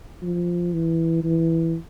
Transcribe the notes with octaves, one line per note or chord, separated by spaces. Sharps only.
F3
E3
E3